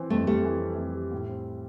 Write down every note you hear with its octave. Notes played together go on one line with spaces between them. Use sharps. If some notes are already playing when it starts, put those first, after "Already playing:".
Already playing: E3 C4
F2 A3
G3 A3
E3
C4
F2
G3
A2
C4